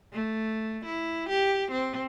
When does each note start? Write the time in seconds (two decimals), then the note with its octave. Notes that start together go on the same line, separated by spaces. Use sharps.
0.13 A3
0.85 E4
1.29 G4
1.71 C4